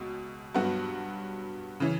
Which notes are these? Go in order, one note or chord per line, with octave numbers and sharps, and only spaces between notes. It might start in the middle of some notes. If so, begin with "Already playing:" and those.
Already playing: C#2 B2
G2 F#3 B3 F#4
C#3 E3